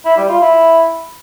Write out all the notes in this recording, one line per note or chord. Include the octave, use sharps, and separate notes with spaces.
E4
G3
F4
E4